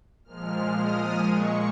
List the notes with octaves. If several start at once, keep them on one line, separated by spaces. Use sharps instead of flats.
A#2 F3 G#3 F6
D#6
A#2 G#3 C#6